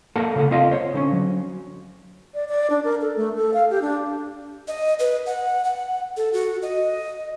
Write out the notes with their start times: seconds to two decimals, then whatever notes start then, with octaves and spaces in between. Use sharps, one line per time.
0.16 A#3 A4 A#4 F#5 A5
0.36 C#3 A#3 A4 F#5
0.51 C4 F4 D#5 F5
0.71 C5 C#5
0.94 D3 C4 C#4
1.12 F#3
2.34 D5
2.49 D5
2.70 D4
2.84 A#4
3.01 A4
3.16 A3
3.37 A4
3.54 F5
3.70 G4
3.82 D4
4.68 D#5
4.99 B4
5.27 F#5
5.65 F#5
6.17 A4
6.33 F#4
6.62 D#5